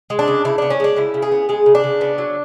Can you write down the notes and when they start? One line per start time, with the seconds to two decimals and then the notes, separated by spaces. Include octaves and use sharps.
0.10 G#3
0.19 D4
0.28 C#3
0.45 C#3 E4
0.58 B3 D4
0.70 C#4
0.80 G#3 D4
0.96 C#3 E4
1.14 C#3
1.22 G#4
1.32 B3
1.49 G#3 G#4
1.66 C#3
1.75 D4
1.84 C#3
2.01 B3
2.18 F#3